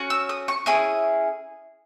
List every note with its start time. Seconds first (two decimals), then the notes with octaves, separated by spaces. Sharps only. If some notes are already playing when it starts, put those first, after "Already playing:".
Already playing: C#4 F#4
0.10 E6
0.29 D#6
0.48 C#6
0.66 C#4 E4 G#4 D#6